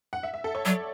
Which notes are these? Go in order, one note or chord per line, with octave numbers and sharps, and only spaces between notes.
F#5
E5
E5
A4
C#5
F#3 D5